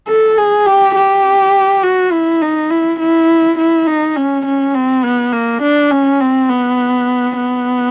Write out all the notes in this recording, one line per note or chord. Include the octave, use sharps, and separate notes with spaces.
A4
G#4
G4
G4
F#4
E4
D#4
E4
E4
E4
D#4
C#4
C#4
C4
B3
A#3
D4
C#4
C4
B3
B3